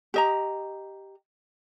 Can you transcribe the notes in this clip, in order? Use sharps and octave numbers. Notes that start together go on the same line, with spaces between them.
G4 D#5 A#5